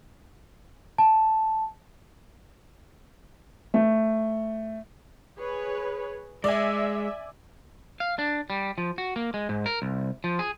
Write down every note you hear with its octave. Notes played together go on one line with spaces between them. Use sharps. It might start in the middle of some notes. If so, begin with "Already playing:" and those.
A5
A3
G#4 B4 C#5
G#3 D5 E5 G#5
F5
D4
G3
F3
F#4
A#3
G#3
G#2
A#4
C2
F3
G#4